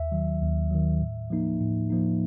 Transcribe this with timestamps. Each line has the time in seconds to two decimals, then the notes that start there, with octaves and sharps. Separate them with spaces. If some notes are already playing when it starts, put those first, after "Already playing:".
Already playing: D#2 E5
0.12 D#3 F#3
0.41 D#2
0.71 D#3 F#3
1.01 A2
1.30 F3 A#3 D#4
1.61 A2
1.90 F3 A#3 D#4